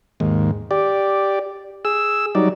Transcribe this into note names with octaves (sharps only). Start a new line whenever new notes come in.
D#2 G#2
G4 D5
G#4 E6
F#3 G3 D#4 D5